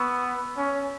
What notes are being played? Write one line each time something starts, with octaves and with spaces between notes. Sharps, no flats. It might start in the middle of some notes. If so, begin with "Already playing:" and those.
Already playing: B3 C#6 E6
C#4